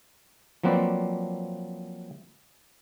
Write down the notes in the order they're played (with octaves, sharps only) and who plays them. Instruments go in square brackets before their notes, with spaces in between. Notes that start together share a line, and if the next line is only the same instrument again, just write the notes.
[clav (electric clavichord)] F3 F#3 A#3 C4 B4 D5